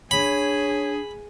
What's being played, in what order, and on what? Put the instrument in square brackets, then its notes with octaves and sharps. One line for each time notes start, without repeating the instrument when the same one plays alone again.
[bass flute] D4 [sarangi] G#4 [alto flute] C#5 [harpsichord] B5